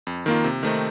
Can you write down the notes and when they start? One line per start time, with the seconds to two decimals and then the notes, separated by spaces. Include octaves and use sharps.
0.07 F2
0.26 D#3 A#3 F4
0.44 C3
0.63 D#3 A3 C4 D#4